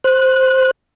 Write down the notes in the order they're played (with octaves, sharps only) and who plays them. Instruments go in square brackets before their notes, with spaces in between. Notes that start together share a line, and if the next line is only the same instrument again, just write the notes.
[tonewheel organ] C5 F#6